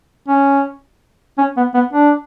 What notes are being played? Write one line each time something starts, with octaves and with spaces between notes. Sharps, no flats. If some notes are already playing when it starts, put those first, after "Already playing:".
C#4
C#4
B3
B3
D4